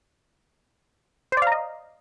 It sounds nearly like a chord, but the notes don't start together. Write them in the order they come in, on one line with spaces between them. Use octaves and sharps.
C5 D5 F5 A#5 D#5